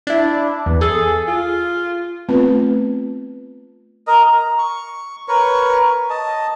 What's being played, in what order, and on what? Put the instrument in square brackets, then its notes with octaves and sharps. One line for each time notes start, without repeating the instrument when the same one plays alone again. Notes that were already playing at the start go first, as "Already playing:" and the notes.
[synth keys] D4 E4
E2
[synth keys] G#4 [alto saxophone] A4
[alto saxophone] F4
[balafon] A3 B3 C4 F4 B4
[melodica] A#4 D#5
A#5
C#6
A#4 B4 C#5 C#6
D#5 A5